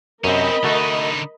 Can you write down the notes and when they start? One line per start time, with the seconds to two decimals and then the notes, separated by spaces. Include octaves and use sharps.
0.24 F#2 C3 C4 C#4 A#4 D#5 B5
0.64 D3 A3 D#4 F#4 A5